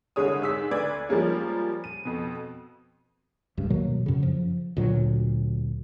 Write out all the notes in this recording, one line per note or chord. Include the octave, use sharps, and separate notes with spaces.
C2 D3 G#3 C#5 D#6
G#2 E6 B6
D2 B4 D5 G#6
F3 G3 G#3 A#3 C#4
D#7
F2 B2
F1 C#2 G2
B2 D#3 F#3 A#3
F#2 C#3
F3
D2 A#2 F#3